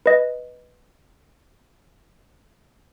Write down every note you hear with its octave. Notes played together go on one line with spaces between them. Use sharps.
B4 D#5